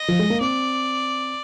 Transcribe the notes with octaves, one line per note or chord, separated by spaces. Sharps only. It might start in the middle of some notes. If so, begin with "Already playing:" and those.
Already playing: D#5
F3
G#3
A#3
C4 D5